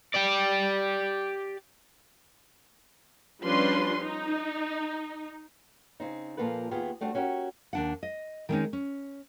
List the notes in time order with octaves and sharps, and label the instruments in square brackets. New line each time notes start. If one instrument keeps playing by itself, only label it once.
[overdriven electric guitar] G4 D5
[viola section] F3 G3 C#4 D4 B4 C6
D#4
[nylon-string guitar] C#3 C4 D#4
A#2 F3 A#3 F4 A4 B4
D#2 B3 F4 G4 G#4
G3 A3 C4 D4 F#4
C#4 F#4 G4 A#4
D#2 D4 F#5
D#5
D#3 G3 G#3 C4 C#4 D#4
C#4